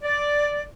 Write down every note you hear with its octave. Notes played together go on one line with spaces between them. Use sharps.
D5